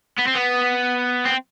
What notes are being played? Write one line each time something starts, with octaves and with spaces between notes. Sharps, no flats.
B3
C4
B3
C4